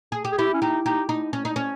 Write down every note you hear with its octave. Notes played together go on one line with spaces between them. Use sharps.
G#4
G4
G#4
E4 G4
C#4
D#4 G4
D#4 G4
D#4
C#4
D#4
C#4